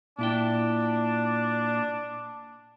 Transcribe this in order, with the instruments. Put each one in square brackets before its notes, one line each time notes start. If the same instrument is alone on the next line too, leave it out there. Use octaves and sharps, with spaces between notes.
[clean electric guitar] A#2 E4 G5 [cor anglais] D4